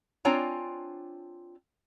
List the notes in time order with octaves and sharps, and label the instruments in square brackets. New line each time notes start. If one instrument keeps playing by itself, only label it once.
[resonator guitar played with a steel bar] C4 D4 F4 C#5 G#5 A#5